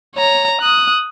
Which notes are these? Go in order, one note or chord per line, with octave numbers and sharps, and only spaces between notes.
C#5 A#5
D#6 F#6